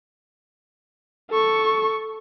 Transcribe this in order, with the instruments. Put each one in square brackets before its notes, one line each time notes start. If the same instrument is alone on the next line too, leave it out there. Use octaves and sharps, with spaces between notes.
[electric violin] A4 C#6